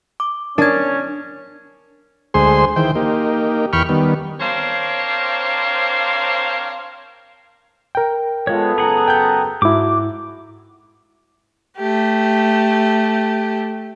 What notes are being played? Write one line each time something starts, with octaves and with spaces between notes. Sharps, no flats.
D6
C#4 D4 A#4 G#6
D2 G#3 G#4 C5 C6
D#3 E3 C5 G5
A#3 D#4 G4
E2 G5 B5 C#6 F6
D#3 G3 B3
C4 D4 A#4 C5 C#5 F5
A#4 G5
G#3 B3 F4 A4 C#5
F#2 C#3 G#4 F#5 A#5
G5 G6
G#2 E4 F#4 D6
A3 G4